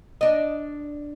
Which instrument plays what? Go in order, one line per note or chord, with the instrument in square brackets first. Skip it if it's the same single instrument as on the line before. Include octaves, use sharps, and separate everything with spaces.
[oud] D4 D#5